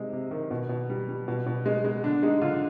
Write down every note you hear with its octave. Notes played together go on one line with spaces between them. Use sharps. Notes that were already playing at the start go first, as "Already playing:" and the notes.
Already playing: C3 G#3 D#4
C3
D#3
B2
B2
G3
G3
B2
B2
G#3
G#3
D3 D4
G#3 D#4
D3 F4